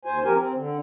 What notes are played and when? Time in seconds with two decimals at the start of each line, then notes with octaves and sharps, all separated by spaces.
0.05 D#2 C5 G#5
0.24 F3 C4 G4 A#4 G#5
0.36 C4
0.55 D3